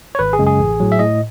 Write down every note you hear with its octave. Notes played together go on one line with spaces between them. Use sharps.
C#5
G#1 B4
G#4
F#2 C#3 G#3
G#4
A1
A2 F#3
E5
A2 D#5